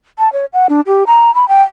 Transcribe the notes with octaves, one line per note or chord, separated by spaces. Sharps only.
A5
C#5
F#5
D4
G4
A#5
B5
G5